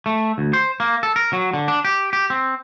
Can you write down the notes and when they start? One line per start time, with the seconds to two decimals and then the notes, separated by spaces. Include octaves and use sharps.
0.06 A3
0.38 D2
0.53 C5
0.80 A#3
1.03 A4
1.16 A#4
1.33 F#3
1.53 D3
1.68 D4
1.85 G4
2.13 G4
2.30 C4